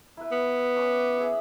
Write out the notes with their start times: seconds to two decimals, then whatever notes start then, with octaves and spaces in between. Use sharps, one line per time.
0.17 E4 B4
0.32 B3
0.76 C#4 B5 D6
1.18 G#4 E5